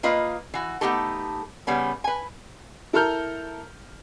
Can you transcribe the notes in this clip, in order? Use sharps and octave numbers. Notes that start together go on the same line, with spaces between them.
A#3 F4 B4 D#5
E3 F#4
A3 B3 C4 D#4 G4 A4
C#3 G3 B3 C#4
B4 G#5
E4 A4 A#4 A#5 F6 G6